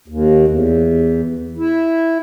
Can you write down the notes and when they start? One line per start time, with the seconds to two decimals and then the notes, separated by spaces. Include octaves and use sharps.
0.08 D#2
0.48 E2
1.58 E4